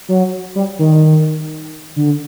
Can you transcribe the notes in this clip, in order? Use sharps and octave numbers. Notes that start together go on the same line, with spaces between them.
F#3
G3
D#3
D3